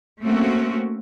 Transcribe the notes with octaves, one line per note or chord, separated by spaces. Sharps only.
A3 A#3 C4 C#4 F#4